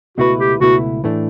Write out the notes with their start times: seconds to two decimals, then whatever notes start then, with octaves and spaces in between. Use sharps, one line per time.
0.18 C#2 B2 A3 E4 F#4 B4
0.39 G4
0.60 C#2 B2 A3 E4 F#4 B4
1.04 A2 E3 A3 D4